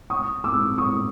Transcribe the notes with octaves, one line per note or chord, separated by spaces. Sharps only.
C#6 D#6
D6 E6
C#6 D#6